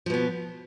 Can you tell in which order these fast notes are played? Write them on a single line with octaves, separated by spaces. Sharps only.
F3 B2 B3